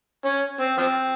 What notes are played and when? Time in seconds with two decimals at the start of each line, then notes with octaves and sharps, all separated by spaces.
0.25 C#4
0.60 C4
0.77 F3 C4